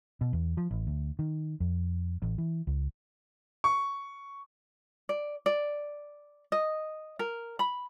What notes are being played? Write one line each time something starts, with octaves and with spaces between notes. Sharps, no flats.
B2
E2
F3
A1
D2
D#3
F2
A1
E3
C#2
C#6
D5
D5
D#5
A#4
B5